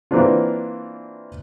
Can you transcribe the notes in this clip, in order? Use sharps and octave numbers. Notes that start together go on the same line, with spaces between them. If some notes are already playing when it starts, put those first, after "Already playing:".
E3 A#3 C4 D4 F4